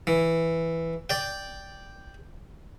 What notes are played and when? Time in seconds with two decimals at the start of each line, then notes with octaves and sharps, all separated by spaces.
0.07 E3
1.10 D5 G5